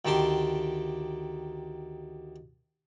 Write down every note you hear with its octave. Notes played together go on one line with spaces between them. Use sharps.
D2 D#3 G4 A5 C6